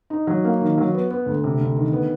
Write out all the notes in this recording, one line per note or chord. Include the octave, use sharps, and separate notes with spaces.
D#4
F#3
A#3
D#3
F#3
B3
B3
D2
C3
D2
D#3
B3